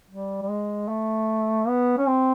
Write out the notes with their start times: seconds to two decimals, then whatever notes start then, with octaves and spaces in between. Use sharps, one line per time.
0.10 G3
0.42 G3
0.49 G#3
0.88 A3
1.68 B3
1.98 C#4
2.07 C4